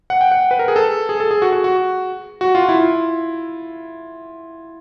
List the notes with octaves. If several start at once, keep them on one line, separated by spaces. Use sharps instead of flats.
F#5
G5
F#5
B4
A#4
G#4
A4
G#4
A4
G#4
F#4
F#4
F#4
F#4
F4
E4
F4